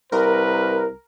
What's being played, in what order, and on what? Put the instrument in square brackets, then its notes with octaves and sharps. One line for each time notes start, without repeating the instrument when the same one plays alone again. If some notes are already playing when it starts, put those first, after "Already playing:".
[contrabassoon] C2 [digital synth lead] A#4 [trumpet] B4